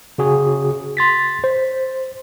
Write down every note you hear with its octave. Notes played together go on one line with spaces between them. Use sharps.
C#3 F#4 G#4
C6 A6 B6
C5